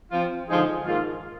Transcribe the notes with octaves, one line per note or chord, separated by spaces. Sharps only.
F3 C4 F4
D3 F3 G#3 D#4 G#4
G#2 D#3 A#3 F4